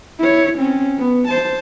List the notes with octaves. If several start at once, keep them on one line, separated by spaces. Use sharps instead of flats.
E4 C#5
C4 C#4
B3
C5 A5